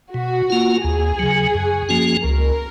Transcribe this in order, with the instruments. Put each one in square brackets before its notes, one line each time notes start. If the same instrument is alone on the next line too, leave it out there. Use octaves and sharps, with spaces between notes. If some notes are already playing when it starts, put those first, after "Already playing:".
[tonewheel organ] B2 [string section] F#4
[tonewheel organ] A#3 F4
[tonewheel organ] D#2 [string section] G#4
[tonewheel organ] C#3 F#3
F#2
F3 A#3 C#4 F#4
[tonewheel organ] C#2 [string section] A#4